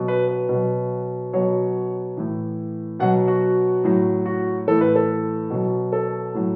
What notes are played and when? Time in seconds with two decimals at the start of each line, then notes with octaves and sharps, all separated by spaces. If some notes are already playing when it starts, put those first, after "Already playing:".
Already playing: B2 F#3
0.08 B4
0.28 B4
0.49 B2 F#3
1.33 B2 F#3 C#5
2.17 A2 E3
3.00 B2 F#3 F#5
3.28 F#4
3.84 A2 F#3
4.26 F#4
4.67 A2 E3 A4
4.81 B4
4.96 A4
5.50 B2 F#3
5.92 A4
6.34 A2 F#3